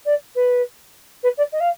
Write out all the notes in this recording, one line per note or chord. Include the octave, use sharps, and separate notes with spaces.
D5
B4
B4
D5
D#5
F5